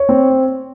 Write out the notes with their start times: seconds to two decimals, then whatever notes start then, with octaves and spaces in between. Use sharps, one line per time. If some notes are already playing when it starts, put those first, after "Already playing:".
Already playing: C#5
0.09 C4